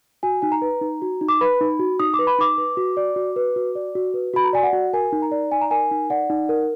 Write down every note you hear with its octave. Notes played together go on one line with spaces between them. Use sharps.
F#4 G#5
D#4 G#5
A#5
B4
D#4
F#4
D#4
D6
B4 B5
D#4
F#4
D#4 D#6
D6
B4
B5
D#4 D6
B4
F#4
D5
F#4
B4
F#4
D5
F#4
B4
F#4 B5
A#5
D5 G#5
F#5
F#4
A#4 G#5
D#4
A#5
D5
D#4 G#5
A#5
A#4 G#5
D#4
D5 F#5
D#4
A#4